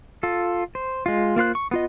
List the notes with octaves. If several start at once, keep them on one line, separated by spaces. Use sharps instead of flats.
F4 A4
C5
G#3 F4
A#3 F4 C5 F#6
C#6
B3 F4 D#5